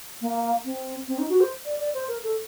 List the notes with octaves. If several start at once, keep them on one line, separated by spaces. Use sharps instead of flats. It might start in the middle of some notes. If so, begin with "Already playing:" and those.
A#3
C4
C4
D#4
F#4
C5
D5
D5
C5
A#4
A4